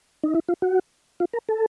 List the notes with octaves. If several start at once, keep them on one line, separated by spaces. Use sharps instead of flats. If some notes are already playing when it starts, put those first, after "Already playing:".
D#4
E4
F4
F#4
F4
A#4
A4